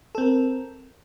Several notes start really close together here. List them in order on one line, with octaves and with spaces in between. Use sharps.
A4 C4 A#4